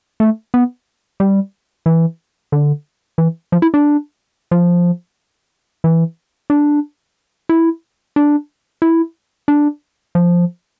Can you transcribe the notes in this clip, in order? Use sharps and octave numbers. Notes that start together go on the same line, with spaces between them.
A3
B3
G3
E3
D3
E3
F3
E4
D4
F3
E3
D4
E4
D4
E4
D4
F3